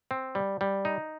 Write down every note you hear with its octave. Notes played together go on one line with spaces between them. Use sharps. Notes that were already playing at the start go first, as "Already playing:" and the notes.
C4
G3
G3
D#4